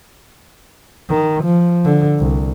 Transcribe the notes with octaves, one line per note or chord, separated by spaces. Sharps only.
D#3
F3
D3
C2